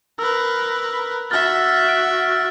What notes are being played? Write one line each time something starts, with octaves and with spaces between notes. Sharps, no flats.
A#4 B4 E6
F#4 E5 F6 A6
F#6 D7